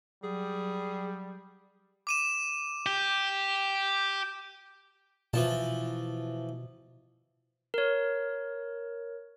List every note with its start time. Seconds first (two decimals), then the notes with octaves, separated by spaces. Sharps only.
0.23 F#3 G3 G#4
2.07 D6 D#7 E7
2.86 G4
5.33 B2 E3 F3 A5
7.74 A#4 C#5